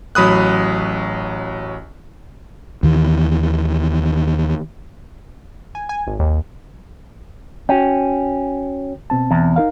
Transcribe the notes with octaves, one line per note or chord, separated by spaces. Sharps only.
A1 F#3 B5 D#6 F#6
D#2 D#3 E3
G#5
G#5
G#1
D#2
C#4 F#4 G5
B2 C4 A5
E2
D#4 A#4 F5